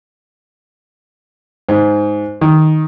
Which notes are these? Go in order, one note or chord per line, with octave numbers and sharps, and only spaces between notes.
G#2
D#3